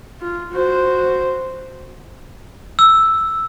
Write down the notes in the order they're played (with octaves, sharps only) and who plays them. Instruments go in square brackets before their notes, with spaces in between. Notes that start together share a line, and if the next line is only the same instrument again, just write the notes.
[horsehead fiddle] F4
F#4 C5
[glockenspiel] E6